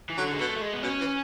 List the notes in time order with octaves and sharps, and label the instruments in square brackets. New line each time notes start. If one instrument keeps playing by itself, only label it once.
[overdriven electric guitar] E3
[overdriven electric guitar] D3 [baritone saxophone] F#3
[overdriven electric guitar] G#3
[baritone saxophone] B2 [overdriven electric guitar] A3
[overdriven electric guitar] A3
G#3
B3
[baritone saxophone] B2 [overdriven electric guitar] C#4
[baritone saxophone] E3